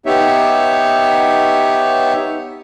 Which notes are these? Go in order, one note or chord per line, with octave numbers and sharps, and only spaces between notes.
B3 D#4 G4 C#5 E5